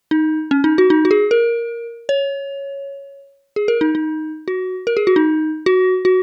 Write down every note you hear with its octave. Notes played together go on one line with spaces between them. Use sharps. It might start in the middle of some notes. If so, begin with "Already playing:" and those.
D#4
C#4
D#4
F#4
D#4
F#4
G#4
A#4
C#5
G#4
A#4
D#4
D#4
F#4
A#4
G#4
F#4
D#4
F#4
F#4